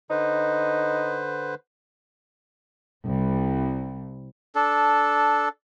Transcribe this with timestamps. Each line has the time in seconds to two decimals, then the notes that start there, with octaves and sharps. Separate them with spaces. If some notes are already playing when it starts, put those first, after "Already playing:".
0.10 D3 D#4 B4 C5
3.05 C2
4.55 D4 A4